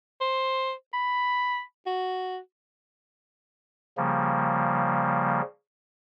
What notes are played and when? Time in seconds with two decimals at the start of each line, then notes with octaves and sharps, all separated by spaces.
0.21 C5
0.93 B5
1.86 F#4
3.97 C#3 F3 G3 A#3